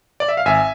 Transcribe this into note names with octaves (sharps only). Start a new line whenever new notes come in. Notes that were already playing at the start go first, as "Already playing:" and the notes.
D5
E5
F5
G#1 E5 G#5